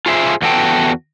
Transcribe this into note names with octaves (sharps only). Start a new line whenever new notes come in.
F4 G#4 C5 E5
E2 B3 F#4 A4 G5